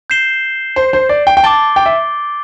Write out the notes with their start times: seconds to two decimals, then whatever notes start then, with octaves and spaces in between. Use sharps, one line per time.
0.10 G6 C7 E7 G7
0.76 C5
0.93 C5
1.09 D5
1.27 G5
1.37 G5
1.44 A5 D6 A6 D7 G7
1.76 G5
1.86 E5